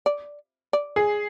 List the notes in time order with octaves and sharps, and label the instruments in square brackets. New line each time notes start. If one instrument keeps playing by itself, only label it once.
[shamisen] D5
D5
[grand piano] G#4